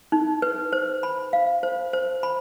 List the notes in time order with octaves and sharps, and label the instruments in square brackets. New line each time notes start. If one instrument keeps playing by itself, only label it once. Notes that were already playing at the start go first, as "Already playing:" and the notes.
[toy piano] D#4
B4
C5
B5
F5
C5
C5
B5